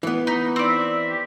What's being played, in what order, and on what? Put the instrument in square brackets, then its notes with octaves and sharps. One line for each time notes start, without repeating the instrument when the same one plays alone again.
[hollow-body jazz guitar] E3 B3
[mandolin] D#4 [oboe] B5
[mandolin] C4 D5
[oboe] E5
G4